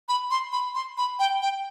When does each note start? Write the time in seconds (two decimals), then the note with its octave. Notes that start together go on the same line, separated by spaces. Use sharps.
0.09 B5
0.31 C6
0.52 B5
0.75 C6
0.97 B5
1.19 G5
1.42 G5